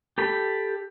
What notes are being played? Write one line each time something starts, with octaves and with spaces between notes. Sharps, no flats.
G4 A4 B5